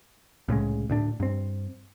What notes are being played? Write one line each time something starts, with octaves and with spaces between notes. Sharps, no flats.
C2 A2 C#3 G#3
D2 A2 D4
G2 C4